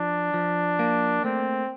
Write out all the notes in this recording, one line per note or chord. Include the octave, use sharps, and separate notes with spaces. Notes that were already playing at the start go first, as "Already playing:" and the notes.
Already playing: F3 D4
F3
A#3
A3 C4